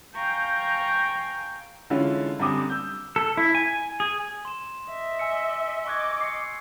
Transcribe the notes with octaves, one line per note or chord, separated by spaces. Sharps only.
F5 G5 G#5 A#5 C#6 G6
D3 E3 G#3 C#4 E4 F4
F#2 D3 G3 C4 D6 D#6
E6 G6
A4
E4
G#5
G#4
C6 E7
D#5 E5
G#5 E6 C#7
D#5 C#6 D6 F#6 G#6
C7 C#7